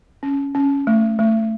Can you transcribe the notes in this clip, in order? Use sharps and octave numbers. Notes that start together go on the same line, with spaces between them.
C#4
C#4
A3
A3